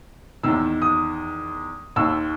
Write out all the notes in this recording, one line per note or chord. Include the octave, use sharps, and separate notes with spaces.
E2 D#3 E6
D#6
D#2 D#3 E6